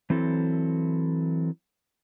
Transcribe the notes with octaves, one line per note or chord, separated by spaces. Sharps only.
E3 F#3 C4 E4 A4